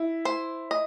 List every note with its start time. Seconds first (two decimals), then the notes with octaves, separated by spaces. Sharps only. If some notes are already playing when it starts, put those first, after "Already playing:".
Already playing: E4
0.25 C5
0.71 D#5